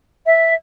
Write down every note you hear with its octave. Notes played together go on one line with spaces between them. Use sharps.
E5